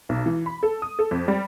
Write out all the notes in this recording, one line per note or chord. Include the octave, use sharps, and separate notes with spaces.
B1
E3
B5
A4
D#6
A4
F2
G3